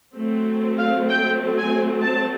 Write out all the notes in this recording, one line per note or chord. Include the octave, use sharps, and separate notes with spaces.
F#3 A3 C4
F5
G5
G#5
A5